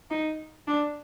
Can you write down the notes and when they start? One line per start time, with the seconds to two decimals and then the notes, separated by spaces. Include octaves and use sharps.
0.11 D#4
0.68 D4